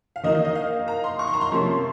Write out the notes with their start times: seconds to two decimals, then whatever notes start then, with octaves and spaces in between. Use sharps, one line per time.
0.16 F5
0.23 D#3 A#3 D#4 D#5
0.35 D#5
0.45 D#5
0.55 F5
0.88 A#5
1.04 C6
1.19 C#6
1.27 C6
1.34 A#5
1.41 C6
1.51 C3 F3 A#3 C#4